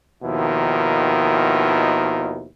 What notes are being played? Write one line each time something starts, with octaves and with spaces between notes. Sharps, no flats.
D#2 B2 D#3 F3 E4